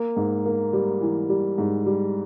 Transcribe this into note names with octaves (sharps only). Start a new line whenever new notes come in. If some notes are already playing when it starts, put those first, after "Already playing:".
Already playing: A#3
G#2
A#3
G3
E3
G3
G#2
G3